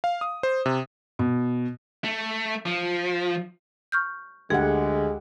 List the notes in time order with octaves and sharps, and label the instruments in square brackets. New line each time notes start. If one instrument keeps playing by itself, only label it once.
[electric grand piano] F5
D#6
C5
C3
[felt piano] B2
[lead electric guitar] A3
F3
[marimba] C#6 F6 G6
[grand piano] D2 [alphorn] G#3 [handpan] G4 F#5 [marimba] G#4